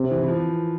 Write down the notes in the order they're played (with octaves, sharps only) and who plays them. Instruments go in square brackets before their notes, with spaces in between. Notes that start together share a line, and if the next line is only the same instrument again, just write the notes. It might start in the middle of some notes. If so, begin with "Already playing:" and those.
Already playing: [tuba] C3
[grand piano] E3
E3
F3